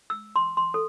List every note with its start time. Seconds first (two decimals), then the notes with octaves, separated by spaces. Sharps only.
0.10 E6
0.36 C6
0.57 C6
0.74 A4